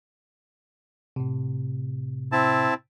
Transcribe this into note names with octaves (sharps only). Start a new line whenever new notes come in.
A2 C3
C4 E4 A5